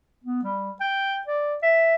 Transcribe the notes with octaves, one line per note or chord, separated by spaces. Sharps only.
B3
G3
G5
D5
E5